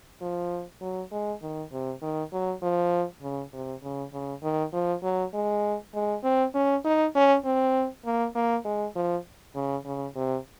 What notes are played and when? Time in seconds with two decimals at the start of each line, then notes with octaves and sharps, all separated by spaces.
0.21 F3
0.81 F#3
1.12 G#3
1.42 D#3
1.72 C3
2.02 D#3
2.32 F#3
2.62 F3
3.22 C#3
3.53 C3
3.82 C#3
4.13 C#3
4.43 D#3
4.72 F3
5.03 F#3
5.33 G#3
5.94 G#3
6.23 C4
6.55 C#4
6.85 D#4
7.15 C#4
7.44 C4
8.05 A#3
8.35 A#3
8.65 G#3
8.95 F3
9.55 C#3
9.85 C#3
10.15 C3